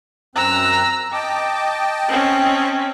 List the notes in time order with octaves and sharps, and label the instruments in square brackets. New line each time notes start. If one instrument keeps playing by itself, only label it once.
[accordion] F#2 C4 F#6 [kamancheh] A#5 E6
[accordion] D#5 G5 A5 [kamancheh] D6
[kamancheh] C4 C#4